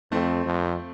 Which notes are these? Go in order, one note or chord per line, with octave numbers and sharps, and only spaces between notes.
F2 A3 C4
F2